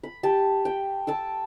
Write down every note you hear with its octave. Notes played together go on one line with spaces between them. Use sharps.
B5
G4 G5 A5
G5
A5 D6 E6